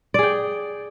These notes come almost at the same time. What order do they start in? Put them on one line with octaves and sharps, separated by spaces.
D5 G#4 G5